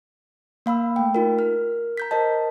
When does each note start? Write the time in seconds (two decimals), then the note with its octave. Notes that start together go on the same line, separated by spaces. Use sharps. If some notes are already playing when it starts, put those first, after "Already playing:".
0.66 A#3 F5 B5 E6
0.96 A3 G5
1.15 D#4 F4 A#4
1.38 A#4 F6
1.97 A#5 G6 B6
2.11 A#4 C5 D#5 A5